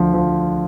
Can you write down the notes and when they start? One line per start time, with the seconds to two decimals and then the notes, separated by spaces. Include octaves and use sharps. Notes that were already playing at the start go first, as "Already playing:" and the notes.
Already playing: D2 D3 F3
0.14 F3